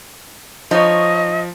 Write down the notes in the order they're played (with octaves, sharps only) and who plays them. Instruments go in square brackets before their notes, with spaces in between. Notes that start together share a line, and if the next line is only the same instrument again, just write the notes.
[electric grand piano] F3 [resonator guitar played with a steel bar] D#4 C#5 [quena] D#5